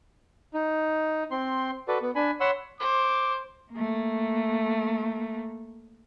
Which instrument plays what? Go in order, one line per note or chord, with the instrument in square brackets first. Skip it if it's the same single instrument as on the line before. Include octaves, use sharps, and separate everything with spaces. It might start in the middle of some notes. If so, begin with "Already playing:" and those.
[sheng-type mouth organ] D#4
C4 C6
F#4 A4 B4 D5
B3
D4 G#5 B5
C#5 F#5 B5 C6 E6
[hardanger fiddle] C5 [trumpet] D6
[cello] A3 A#3